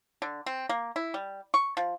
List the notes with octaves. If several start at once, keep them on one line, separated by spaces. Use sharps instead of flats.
D3
C4
A#3
E4
G3
C#6
F3